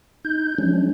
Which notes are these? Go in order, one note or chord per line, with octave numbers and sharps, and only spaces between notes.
D#4 G6
F3 F#3 G#3 C#4 D4